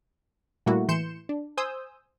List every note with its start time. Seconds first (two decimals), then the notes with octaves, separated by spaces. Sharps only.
0.66 A#2 G3 A3 A#3 E4 F#4
0.88 A2 E3 C6 G6 C#7 E7
1.29 D4
1.57 C5 G#5 D#6 E6 G6